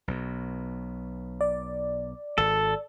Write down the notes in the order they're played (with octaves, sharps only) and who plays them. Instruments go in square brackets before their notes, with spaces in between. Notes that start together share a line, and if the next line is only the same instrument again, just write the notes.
[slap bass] B1 B2
[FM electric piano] D5
[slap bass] G#1 [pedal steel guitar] A4